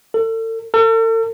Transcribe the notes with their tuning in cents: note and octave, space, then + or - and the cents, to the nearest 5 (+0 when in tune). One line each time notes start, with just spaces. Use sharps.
A4 +40
A4 +45